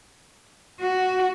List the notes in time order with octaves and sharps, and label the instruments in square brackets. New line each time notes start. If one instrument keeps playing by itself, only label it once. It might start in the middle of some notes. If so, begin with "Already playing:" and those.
[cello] F#4